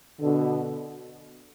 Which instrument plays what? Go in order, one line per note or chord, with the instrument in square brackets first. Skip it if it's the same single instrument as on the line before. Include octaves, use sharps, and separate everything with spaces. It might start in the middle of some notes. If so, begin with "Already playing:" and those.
[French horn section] B2 D3